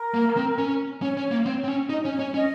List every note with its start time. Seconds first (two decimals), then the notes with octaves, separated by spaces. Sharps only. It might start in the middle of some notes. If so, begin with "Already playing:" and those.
Already playing: A#4
0.14 A#3
0.37 C4
0.58 C#4
1.02 C#4 C#5
1.17 C#4
1.31 A#3
1.46 C4
1.64 C4
1.68 C#4
1.89 D#4 D#5
2.02 C#5
2.05 C#4
2.12 C#5
2.19 C#4
2.24 C#5
2.34 C#4 D#5